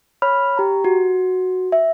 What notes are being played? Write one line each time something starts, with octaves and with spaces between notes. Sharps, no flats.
C#5 B5 F6
G4 A#5
F#4
E5